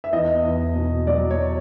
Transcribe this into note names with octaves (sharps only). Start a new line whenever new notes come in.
E5
E2 D#5
E2
B2
F#3 D5
C#5